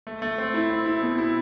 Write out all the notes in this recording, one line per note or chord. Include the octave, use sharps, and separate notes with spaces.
A3
A3
C4
E4
C4
E4
B2
E4